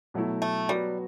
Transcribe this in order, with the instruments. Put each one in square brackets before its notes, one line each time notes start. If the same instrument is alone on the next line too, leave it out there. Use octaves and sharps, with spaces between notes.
[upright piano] B2 F#3 A3 E4
[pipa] A3
[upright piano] F#3 B3 F#4 [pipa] G3